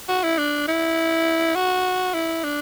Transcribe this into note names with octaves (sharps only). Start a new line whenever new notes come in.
F#4
E4
D4
E4
F#4
E4
D4